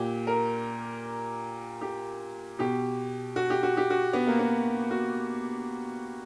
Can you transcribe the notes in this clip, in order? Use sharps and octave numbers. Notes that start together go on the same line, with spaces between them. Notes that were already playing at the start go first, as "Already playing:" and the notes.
Already playing: A#2 G4
A#4
G4
B2 G4
F#4
G4
F#4
G4
F#4
B3
A#3
B3
F#4